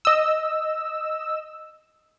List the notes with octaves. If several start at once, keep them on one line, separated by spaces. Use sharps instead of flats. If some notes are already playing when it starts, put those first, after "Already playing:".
D#5 E6